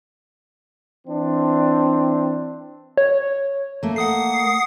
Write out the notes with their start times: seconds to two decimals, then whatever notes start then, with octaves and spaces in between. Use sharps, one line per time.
1.07 E3 C4 D4
2.97 C#5
3.83 A3 A#3
3.96 F#5 D#6 C7